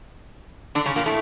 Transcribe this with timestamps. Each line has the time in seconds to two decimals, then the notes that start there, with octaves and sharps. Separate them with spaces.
0.75 D3 D4
0.86 C#3 C#4
0.96 A#2 A#3
1.06 A2 A3